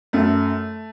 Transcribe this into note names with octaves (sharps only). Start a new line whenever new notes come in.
F#2 A3